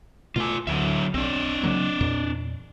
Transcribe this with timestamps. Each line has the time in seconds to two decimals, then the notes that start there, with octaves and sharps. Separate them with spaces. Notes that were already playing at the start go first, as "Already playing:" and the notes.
0.36 B2 A3 F4 G#5
0.67 D2 D3 F#3 E5
1.14 B1 C4 D4
1.63 C#3 F#3 A#3
2.01 E2 A#2